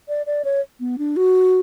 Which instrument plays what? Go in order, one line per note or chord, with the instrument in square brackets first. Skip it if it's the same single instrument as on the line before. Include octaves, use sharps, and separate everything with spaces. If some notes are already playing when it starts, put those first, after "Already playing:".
[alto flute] D5
D5
C#5
B3
D4
F#4